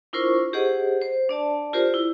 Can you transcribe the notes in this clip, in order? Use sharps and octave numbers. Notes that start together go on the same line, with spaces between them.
D4 E4 F4 A#4 C5 C#6
G4 G#4 C5 D#5 F#5
C5
D4 D5 A5
F4 G4 A#4 C5 D5
E4